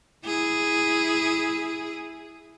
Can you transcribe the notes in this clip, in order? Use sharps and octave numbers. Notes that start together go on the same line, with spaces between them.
E4 G#4